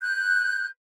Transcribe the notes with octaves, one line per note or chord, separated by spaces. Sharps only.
F#6 G6